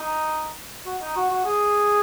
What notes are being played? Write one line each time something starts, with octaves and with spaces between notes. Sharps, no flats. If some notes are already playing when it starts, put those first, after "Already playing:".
Already playing: D#4
F#4
D#4
F#4
F#4
G#4